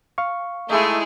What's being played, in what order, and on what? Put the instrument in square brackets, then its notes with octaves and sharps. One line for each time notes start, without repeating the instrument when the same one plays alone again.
[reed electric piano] F5 C#6
[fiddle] G#3 G#4 [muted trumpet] A3 [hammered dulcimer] D#4 E4